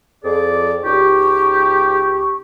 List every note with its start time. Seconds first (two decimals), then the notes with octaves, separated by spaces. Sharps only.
0.24 F2 G#4 D5
0.83 C#2 D#4 G4 C#6